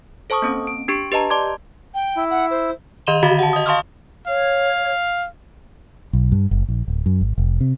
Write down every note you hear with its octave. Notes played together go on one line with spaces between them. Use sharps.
A4 C5 A5 C#6 D#6
A#3 C4 C#4
D7
D4 G4 C#6 D7
G4 B4 D#5 A5 A#5
D5 A5 C6 D6 G#6
G5
E4
F#5
C5
D#3 D#5 C6 D#7 E7 G7
D3 F#4 F5 B5 A6 B6
F#5 A5
D#5 D#6
F5 A5 C6 C#6 D#6 F6
C#5 F5
B1
G2
F#1
A#1
D1
F#2
G#1
F1
C3